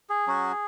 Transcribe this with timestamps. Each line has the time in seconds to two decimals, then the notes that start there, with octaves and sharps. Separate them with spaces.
0.10 G#4
0.27 F#3 C#4 F#4